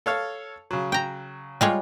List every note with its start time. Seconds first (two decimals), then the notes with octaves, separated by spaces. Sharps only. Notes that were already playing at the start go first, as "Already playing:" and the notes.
0.06 A4 C#5 F5
0.71 C#3 F#3
0.92 G5 A#5
1.61 G3 G#3 F4 C#5